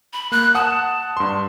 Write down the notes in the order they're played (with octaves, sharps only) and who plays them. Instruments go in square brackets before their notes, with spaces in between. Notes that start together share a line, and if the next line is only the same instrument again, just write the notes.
[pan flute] B5
[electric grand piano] A#3 [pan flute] F#6
[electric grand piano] F#5 D#6 F#6 [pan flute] A5
[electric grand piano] G2 C6